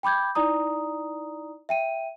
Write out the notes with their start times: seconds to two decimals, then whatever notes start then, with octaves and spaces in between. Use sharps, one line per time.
0.03 G5 B5 D6 G6 G#6
0.35 D#4 E4 D5 A#5 D#6
1.69 E5 G5 D#7